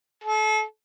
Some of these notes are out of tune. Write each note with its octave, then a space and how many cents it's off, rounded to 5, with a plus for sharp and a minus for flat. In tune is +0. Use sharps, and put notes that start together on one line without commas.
A4 -35